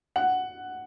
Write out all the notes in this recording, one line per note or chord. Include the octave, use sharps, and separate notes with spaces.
F#5